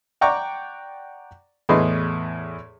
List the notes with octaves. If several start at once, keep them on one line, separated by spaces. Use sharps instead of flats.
D5 F#5 G5 A#5 C#6 D6
E2 A2 G#4 B4 D#5 C6